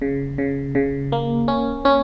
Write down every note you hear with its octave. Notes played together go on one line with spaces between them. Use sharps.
C#3
C#3
C#3
A#3
C#4
C#4